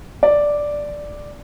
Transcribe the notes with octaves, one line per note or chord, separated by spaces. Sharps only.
D5